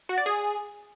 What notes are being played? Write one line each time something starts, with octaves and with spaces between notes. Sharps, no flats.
F#4
D5
G#4